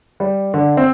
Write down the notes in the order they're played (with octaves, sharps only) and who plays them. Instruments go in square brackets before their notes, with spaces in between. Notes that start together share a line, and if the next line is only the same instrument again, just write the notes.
[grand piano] G3
D3
C4